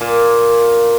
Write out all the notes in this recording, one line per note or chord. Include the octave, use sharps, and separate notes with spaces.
A#2